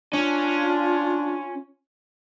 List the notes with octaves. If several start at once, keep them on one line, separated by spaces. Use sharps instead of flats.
C#4 D4 F4